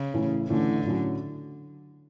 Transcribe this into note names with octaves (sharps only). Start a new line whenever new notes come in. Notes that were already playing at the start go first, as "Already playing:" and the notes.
Already playing: C#3
A1 A2 E3 A3 C#4
A1 A2 D3 E3 A3 C#4
A2 F#3 C#4